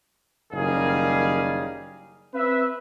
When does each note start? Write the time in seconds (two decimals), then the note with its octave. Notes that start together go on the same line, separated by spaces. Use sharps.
0.53 F#1 D#3 G3 G#4 F5
2.35 C4 B4 E5